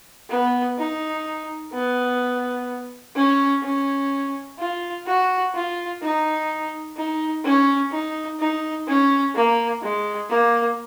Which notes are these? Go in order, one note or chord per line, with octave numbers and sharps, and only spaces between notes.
B3
D#4
B3
C#4
C#4
F4
F#4
F4
D#4
D#4
C#4
D#4
D#4
C#4
A#3
G#3
A#3